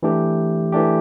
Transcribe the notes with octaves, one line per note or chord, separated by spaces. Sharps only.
E3 A3 D4 G4
E3 A3 D4 G4